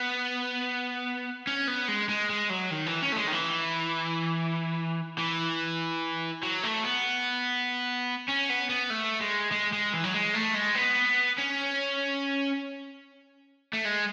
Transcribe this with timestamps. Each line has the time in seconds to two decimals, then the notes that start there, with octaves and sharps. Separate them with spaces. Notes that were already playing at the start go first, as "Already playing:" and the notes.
Already playing: B3
1.47 C#4
1.68 B3
1.88 G#3
2.09 G#3
2.30 G#3
2.50 F#3
2.71 D#3
2.86 E3
3.02 C#4
3.12 A3
3.17 G#3
3.28 D#3
3.33 E3
5.18 E3
6.43 F#3
6.63 A3
6.84 B3
8.28 C#4
8.49 B3
8.69 B3
8.90 A3
9.21 G#3
9.52 G#3
9.73 G#3
9.93 E3
10.04 F#3
10.14 G#3
10.34 A3
10.55 G#3
10.75 B3
11.38 C#4
13.74 A3
13.85 G#3